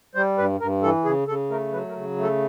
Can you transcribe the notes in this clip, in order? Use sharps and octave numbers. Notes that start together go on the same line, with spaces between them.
G3 C5
G2 B4
G2 A#4
E3 A4
C#3 G#4
C#3 A4
A3 A#4
F#3 B4
A#4
C#3
A3
A4